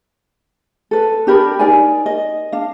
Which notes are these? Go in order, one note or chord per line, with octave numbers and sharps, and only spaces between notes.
A4 B4
D4 G4 A#4 B5
D#4 A#4 D5 G#5
D#5
D4 F5